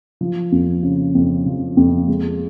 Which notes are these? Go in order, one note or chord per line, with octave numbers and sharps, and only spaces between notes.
F3
F2
C#3
F2
F3
F2
G#3